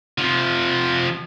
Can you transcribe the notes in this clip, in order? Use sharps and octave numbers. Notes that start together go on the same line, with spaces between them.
C3 F3